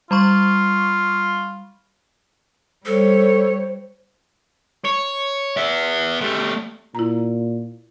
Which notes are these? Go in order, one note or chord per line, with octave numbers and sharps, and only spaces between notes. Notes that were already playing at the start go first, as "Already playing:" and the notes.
G3 F4 B5 C#6
G3 A4 C5 C#5
C#5
B3 E5
G3 A3
A#2 E4 A#5